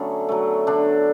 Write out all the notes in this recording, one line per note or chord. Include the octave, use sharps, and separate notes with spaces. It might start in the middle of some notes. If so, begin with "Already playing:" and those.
Already playing: D3 F#3 A3 B3 C#4
F#3 A3
D3 D4